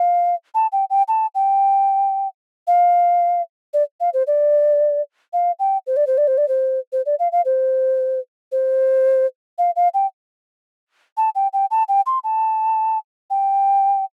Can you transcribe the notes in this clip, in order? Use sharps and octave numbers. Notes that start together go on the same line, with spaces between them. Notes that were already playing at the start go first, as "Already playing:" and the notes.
Already playing: F5
A5
G5
G5
A5
G5
F5
D5
F5
C5
D5
F5
G5
C5
D5
C5
D5
C5
D5
C5
C5
D5
F5
F5
C5
C5
F5
F5
G5
A5
G5
G5
A5
G5
C6
A5
G5